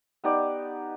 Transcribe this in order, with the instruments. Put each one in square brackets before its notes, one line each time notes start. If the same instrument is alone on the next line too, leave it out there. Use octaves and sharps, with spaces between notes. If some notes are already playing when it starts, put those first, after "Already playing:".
[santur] B3 D#4 G4 D5